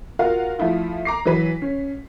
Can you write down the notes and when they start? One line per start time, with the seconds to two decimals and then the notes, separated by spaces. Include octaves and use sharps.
0.19 F4 F#4 A#4 F5 F#5
0.59 F3 A3 E4 F4
1.05 A#5 D6 C7
1.25 E3 F#3 B4 B6
1.62 C#4